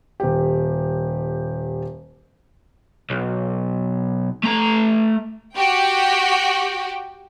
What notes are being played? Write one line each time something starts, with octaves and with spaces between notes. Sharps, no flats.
D#1 G4
B1
A3 A#5
F#4 G4 G5